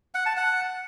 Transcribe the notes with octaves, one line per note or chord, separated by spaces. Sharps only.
F#5
A5
F#5